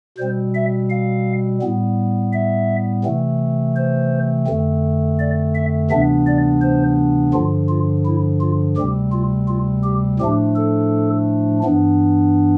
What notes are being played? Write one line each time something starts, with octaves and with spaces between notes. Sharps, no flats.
B2 G3 C4 C5
E5
F5
A2 G3 B3
E5
C3 E3 A3 C4
C5
F2 D3 A3 C4
D5
E5
D2 C3 E3 B3 D4 E5
D5
C5
G2 D3 F3 F4
F4
E4
F4
D2 C3 G3 C4 G4
F4
F4
G4
A2 F3 A3 D4 G4
A4
G2 E3 B3 D4